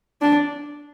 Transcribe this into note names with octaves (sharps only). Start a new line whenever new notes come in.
D4